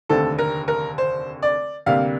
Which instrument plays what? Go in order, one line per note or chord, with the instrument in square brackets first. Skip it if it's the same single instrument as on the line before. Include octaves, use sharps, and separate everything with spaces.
[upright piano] F1 D#2 D3 A3 C4 A4
A#4
A#4
C5
D5
D2 C3 G3 A#3 F5